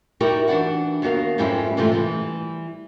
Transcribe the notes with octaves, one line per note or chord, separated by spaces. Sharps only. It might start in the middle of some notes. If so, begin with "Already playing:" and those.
D#4 E4 F#4 G4 A#4 D5
E3 D4 F#4 D5 F#5
D#2 B3 F#4 A#4 F5
F2 G#2 G3 C4 C#4 E4
G#2 C3 E3 F3 A3 F4
E3 G3